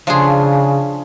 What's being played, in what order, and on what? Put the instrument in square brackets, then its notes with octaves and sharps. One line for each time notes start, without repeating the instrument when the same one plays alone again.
[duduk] C#3 [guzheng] F3 D4 G#4